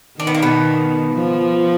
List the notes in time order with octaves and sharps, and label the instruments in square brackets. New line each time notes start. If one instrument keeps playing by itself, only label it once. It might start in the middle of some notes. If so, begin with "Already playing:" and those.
[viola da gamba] D#3 [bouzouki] D4
[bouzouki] B3
A#3
B2 B3
[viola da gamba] F3